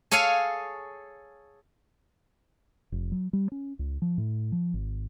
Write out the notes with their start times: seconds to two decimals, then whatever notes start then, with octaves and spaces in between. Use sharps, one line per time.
0.11 G#4 A4 C#5 F5 G#5
2.92 F1
3.12 F#3
3.33 G3
3.52 C#4
3.79 C#2
4.02 F3
4.18 A2
4.52 F3
4.74 G#1